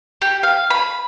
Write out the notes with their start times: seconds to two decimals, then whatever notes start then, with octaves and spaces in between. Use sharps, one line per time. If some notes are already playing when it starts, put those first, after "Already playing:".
0.22 G4
0.43 F5
0.70 B5